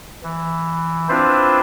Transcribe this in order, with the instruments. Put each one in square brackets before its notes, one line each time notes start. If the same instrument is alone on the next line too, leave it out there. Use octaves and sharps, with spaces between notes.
[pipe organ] E3
C4 D4 E4 F4 B4 C5